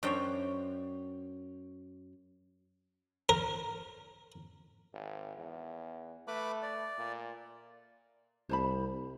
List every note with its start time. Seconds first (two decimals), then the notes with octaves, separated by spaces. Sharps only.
0.03 F#2 D4 C5 C#5 G5
3.29 A#4
4.93 G#1
5.37 E2
6.28 A3 B4 B5 D6
6.62 D5
6.99 A#2
8.49 C2 C5 A5 B5